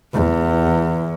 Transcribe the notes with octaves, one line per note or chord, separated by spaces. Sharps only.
E2